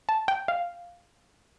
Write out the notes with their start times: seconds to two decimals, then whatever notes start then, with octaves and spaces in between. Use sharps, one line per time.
0.09 A5
0.28 G5
0.48 F5